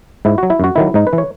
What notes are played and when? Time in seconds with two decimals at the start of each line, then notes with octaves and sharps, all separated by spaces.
0.25 G#2 E4
0.38 F#3 F#4
0.50 E4
0.60 F#2 F#4
0.76 D#3 F#3 E4
0.94 G#2 D#4
1.07 B4
1.13 E3
1.18 C#5